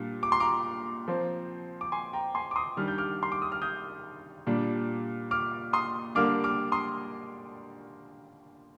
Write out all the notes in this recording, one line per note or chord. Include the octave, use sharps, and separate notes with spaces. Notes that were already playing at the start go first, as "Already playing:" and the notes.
Already playing: A#2 G3 D4
D6
C6
A#5 D6
F3 C4
D6
G#5 C6
G5 A#5
G#5 C6
D6
C6 D#6
D#3 G3 D4 F6
G6
D6 F6
C6
D6
D#6
F6
D#6 G6
A#2 G3 D4
D6 F6
C6 D#6
D3 G3 A#3 D4 D6 F6
D6 F6
C6 D#6